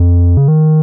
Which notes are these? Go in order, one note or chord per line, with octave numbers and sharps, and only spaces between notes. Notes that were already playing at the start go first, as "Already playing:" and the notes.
Already playing: F2
C#3
D#3